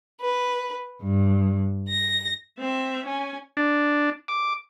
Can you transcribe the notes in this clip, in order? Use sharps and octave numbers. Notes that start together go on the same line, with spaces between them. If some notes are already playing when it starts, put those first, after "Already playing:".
B4
G2
A#6
C4 E5
C#4 G#5
D4
D6